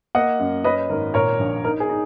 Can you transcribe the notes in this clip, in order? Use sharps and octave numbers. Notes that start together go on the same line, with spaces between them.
A#3 D#5 F#5
F#2
C#4 B4 D#5
G#1 A#4
A#2 A#4 C#5
A#1
D#4 A#4
G#4
D#4